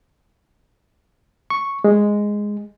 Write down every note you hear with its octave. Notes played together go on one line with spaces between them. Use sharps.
C#6
G#3